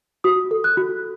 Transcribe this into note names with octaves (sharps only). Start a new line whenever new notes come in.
F#4 D#6
A4
F#6
F#4